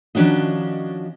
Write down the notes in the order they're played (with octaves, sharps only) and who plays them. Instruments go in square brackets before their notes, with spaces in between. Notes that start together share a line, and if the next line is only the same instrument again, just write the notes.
[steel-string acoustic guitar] D#3 F3 C#4 D4 F#4 D#5